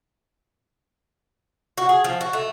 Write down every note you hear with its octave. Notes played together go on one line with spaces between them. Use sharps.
F#4
G#4
F3
F#4
A3